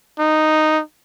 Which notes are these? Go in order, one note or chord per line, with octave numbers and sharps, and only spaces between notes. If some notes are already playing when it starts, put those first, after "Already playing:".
D#4